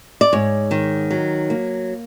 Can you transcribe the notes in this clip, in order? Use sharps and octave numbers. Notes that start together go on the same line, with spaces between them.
D5
G#2 C#5
D#3
F#3
A#3